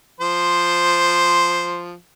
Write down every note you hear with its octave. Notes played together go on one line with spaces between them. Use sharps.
F3 C5